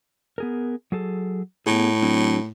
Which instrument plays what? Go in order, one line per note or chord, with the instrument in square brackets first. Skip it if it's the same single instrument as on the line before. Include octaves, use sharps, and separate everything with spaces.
[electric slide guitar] B3 G#4 A#4
F#3 G#4 A4
[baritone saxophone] A2 [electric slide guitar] B3 G#4
[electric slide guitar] F#3 C4 D4